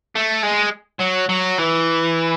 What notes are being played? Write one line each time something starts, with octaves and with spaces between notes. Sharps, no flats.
A3
G#3
F#3
F#3
E3